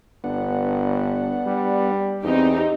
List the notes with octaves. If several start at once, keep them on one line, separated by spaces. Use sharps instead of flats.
G1 B3 D4 F#5
G3
E2 C4 D#4 G4